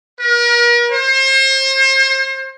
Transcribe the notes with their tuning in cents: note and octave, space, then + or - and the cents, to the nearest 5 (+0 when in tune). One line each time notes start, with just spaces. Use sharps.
A#4 +40
C5 +35